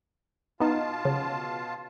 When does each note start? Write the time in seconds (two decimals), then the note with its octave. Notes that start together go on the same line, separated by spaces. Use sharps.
0.60 B2 B3 D#4 F4 A5
1.05 C#3